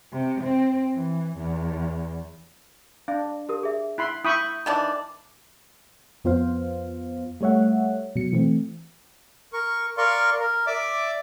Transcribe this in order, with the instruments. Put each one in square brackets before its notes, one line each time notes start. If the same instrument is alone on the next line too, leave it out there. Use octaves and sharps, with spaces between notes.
[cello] C3
C4
E3
E2
[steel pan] D4 [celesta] F5
[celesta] G4 A#4 D#6
G#4 E5
[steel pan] E4 B5 C6 [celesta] F#6
[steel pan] E4 B5 C#6 [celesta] D#6 G6 D#7
[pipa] D#3 E3 D4
[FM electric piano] F2 B3 F4 C5 F5
G3 A3 C#5 E5 F#5
B2 F#3 C#7
E3 A3 C4
[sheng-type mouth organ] A#4 C#6
A#4 D5 F5 C6 C#6
A#4
D5 E5 D6